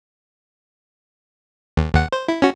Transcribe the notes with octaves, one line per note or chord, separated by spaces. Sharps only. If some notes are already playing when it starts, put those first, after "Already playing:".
D#2
D#2 F#5
C5
E4
C#4 F#4